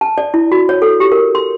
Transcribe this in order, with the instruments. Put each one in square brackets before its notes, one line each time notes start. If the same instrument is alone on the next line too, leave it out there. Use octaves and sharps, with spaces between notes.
[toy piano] A5
D5
E4
F#4
C#5
A4
G4
A#4
C6